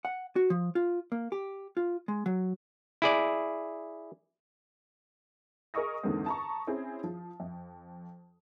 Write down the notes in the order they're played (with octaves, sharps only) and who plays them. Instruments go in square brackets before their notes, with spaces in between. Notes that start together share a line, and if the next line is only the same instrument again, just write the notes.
[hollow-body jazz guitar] F#5
F#4
F3
F4
A#3
G4
F4
G#3
F#3
[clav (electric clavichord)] E4 G#4 D5
[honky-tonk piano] G#4 A#4 D#5 C#6 D#6 A#6
E2 G#2 D3 G#3 A#3 C4
A5 A#5 C#6
C4 C#4 E4 G#4
F3
F2